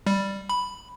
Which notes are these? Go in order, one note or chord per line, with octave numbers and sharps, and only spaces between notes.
G3
B5